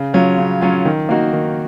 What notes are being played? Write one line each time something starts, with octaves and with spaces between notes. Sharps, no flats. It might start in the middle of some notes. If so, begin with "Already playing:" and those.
Already playing: C#3
F#3 C#4 F4
C#3
F#3 C#4 F4
D#3
A#3 D#4 F#4
D#3